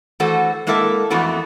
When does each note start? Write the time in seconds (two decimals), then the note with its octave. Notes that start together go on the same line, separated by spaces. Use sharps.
0.20 E3 A3 F#4 A4 C5
0.67 G#3 A#3 E4 A4 E5
1.10 F2 E3 A3 B3 F#4